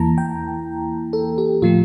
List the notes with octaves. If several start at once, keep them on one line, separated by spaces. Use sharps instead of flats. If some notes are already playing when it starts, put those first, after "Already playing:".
Already playing: E2 E3 A#3 E4 A5 A#5
G5
A4
G4
A2 F3 A3 F4